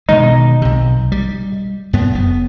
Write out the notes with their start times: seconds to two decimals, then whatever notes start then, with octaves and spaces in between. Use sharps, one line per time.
0.09 B2 D#3 G#3 D#4
0.62 B1 C3
1.12 G3
1.93 F#2 B3
2.15 F1 B3